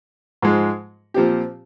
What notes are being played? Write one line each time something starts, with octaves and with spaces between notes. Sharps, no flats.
G#2 F3 G#3
A#2 F3 C4 G4